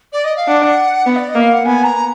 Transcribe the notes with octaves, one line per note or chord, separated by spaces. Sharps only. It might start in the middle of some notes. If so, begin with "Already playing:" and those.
D5
D#5
F5
D4 F#5
B3
D5
D#5
A#3
F5
F#5
B3 G#5
A#5